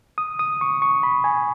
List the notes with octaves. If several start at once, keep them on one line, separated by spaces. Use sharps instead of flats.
D#6
D#6
C#6
C#6
B5
G#5